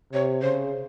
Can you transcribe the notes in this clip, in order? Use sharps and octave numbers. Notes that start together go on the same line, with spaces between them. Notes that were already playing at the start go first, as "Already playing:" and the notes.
C3 C#5
C#3 C5